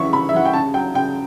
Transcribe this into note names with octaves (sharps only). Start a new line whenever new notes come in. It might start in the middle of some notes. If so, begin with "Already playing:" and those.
Already playing: C#3 E3 E5 C#6
C#3 B5
E5
E3 F#5
G5
C#3 A5
F#3 G5
C#3 G5